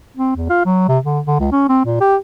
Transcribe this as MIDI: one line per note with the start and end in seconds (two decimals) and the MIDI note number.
0.17 0.32 60
0.36 0.48 40
0.49 0.63 65
0.65 0.85 54
0.89 0.98 48
1.04 1.20 50
1.27 1.38 50
1.40 1.49 37
1.52 1.68 61
1.69 1.80 60
1.85 1.96 46
2.01 2.17 67